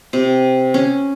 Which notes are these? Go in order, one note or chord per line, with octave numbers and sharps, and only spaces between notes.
C3
C#4